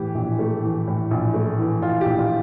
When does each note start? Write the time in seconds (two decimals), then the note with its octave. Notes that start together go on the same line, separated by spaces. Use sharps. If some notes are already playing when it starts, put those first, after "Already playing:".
Already playing: A2 E3 G4
0.15 A#1
0.39 A3
0.63 E3
0.87 A2
1.11 A#1
1.34 A3
1.59 E3
1.82 A2 F4
2.01 G4
2.06 A#1
2.19 F4